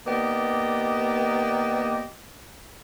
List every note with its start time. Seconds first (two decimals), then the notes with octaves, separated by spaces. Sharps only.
0.06 D#2 A#3 B3 G4 D5 D#5